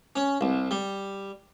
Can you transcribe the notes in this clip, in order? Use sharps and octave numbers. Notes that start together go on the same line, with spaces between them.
C#4
C2
G3